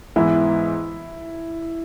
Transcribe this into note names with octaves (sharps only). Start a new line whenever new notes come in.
G#2 E3 B3 E4